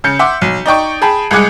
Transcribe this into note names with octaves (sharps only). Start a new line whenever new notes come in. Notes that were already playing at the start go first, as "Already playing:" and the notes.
C#3 G6 C#7
E5 F#5 C6 D6
B1
D#4 D5 G5 C#6
G#4 G5 A5 B5
C2 G#3 G#4 D6 F#6 C#7